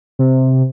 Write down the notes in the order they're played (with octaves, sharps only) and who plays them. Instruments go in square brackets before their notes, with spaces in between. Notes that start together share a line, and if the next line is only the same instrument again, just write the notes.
[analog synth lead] C3